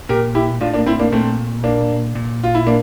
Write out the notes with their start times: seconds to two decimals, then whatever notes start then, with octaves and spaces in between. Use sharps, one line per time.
0.09 A#2 G4 A#4
0.35 E4 G4
0.61 A2 D4 F4
0.74 A#3 D4
0.86 C4 E4
0.99 A#3 D4
1.12 A#2 A3 C4
1.64 A#3 D4
2.15 A#2
2.44 F4
2.55 E4
2.67 A#3 D4